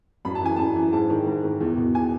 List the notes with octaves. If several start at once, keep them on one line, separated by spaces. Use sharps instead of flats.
F#2 B5
A5
E3 G#5
F#2 A5
E3
G#2 A5
D#3
G#2
D#3
E2
B2
G#5